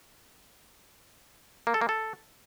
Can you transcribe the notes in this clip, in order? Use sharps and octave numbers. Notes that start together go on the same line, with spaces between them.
A#3
A4
A#3
A4